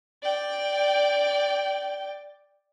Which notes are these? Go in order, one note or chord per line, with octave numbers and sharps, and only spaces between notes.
D5 G5